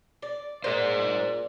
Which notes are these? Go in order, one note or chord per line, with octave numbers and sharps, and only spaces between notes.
D5
A#2 G#4 C5